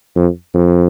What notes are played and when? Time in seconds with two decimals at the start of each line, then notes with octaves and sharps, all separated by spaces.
0.16 F2
0.54 F2